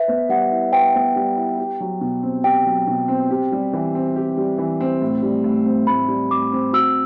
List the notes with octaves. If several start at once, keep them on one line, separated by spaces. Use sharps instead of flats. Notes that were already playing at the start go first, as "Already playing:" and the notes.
Already playing: B4 E5
B3
G3 F#5
E4
B4 G5
B3
G3
E4
G4
F#3
B2
C4
G4 G5
F#3
B2
C4
G4
G3
E3
C4
G4
G3
E3
C4
A2
G3
A2
C4
A2 B5
G3
A2 D6
C4
F#4 E6